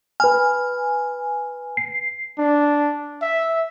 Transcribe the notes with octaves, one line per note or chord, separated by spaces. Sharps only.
B4 G#5 F6
C7
D4
E5